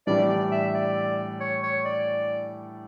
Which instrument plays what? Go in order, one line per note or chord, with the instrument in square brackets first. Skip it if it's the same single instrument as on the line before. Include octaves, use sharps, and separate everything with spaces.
[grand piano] A2 E3 G3 D4 [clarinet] D5
[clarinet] D5
E5
D5
C#5
C#5
D5